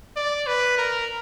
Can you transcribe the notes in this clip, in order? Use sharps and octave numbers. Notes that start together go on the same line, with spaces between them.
D5
B4
A#4